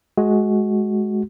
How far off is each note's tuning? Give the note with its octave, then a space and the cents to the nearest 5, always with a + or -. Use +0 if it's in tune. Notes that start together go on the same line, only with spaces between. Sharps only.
G#3 +20 F#4 +0